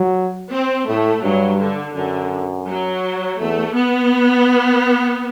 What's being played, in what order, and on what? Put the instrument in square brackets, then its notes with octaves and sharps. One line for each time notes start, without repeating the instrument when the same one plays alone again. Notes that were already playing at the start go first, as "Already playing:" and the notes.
Already playing: [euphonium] F#3
[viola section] C4
[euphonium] A2 [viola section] A3
[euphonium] G2 [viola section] F#3
[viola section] D3
[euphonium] F#2 [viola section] D3
[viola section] F#3
[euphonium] E2 [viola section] A3
[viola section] B3